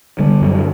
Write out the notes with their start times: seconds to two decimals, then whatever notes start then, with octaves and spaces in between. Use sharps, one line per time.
0.19 D3 G3
0.42 F#2